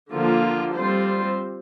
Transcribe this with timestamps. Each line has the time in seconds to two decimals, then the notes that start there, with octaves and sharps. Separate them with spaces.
0.11 D3 F3 A#3 F4
0.74 G3 C4 F4 C5